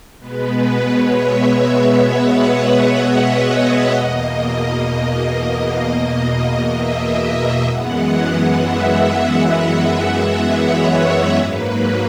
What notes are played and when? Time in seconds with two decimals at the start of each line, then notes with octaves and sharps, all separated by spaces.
0.19 B2 G#3 B3 B4
0.51 B4
0.81 C#5
1.13 E5
2.05 F#5
2.98 D#5
3.61 C#5
3.92 E2 B2 A#3 D#5
6.71 E5
7.18 E5
7.64 F#2 E3 G#3 B3 F#5
8.57 E5
10.44 C#5
11.37 G#2 F#3 A#3 B4